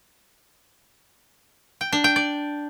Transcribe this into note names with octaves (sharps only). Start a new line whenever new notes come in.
G5
D4
G5
D5